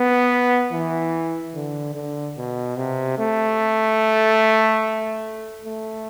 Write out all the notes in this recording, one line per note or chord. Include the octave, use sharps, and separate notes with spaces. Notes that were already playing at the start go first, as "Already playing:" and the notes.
Already playing: B3
E3
D3
D3
B2
C3
A3
A3